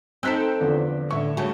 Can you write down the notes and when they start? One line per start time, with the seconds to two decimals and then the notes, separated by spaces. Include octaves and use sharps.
0.23 C4 D#4 A4 E6 F#6 B6
0.60 E2 D3 F3
1.11 A2 D3 E5 C#6
1.37 C#3 A3 A#3 F#4 C#5